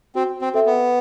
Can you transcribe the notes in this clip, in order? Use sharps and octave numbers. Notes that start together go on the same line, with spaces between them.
C4 F#4
C4
C4 A4 E5
B3